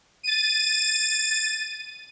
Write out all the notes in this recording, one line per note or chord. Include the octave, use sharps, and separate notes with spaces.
A6 D#7